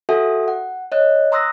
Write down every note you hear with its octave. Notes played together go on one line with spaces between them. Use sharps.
F#4 A4 E5 F#5 G#5 D#6
F#5
C#5 D#5 F#6
A#5 C6 D#6 E6 F#6 A#6